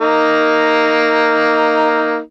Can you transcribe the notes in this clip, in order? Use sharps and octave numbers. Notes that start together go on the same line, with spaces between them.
A#3 D#4